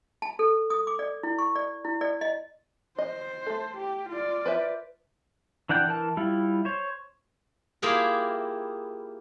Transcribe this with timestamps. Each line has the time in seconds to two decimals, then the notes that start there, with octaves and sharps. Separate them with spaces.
0.22 A5
0.39 A4
0.70 D#6
0.87 D6
0.99 D5
1.23 E4
1.39 C#6
1.56 D5
1.85 E4
2.01 D5
2.21 D#5
2.98 C5 D#5
3.46 A3 A4
3.77 G4
4.09 F4 D5
4.46 B4 C5 E5
5.69 E3 D4 F#5 G5 G6
5.87 E3 A#4 A5
6.17 G3 E4 F4
6.65 C5 C#5
7.82 A#3 E4 F4 G4 G#4 A#4